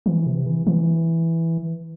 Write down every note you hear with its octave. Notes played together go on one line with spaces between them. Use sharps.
E3
C3
E3
E3